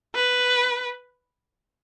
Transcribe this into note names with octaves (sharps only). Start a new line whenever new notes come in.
B4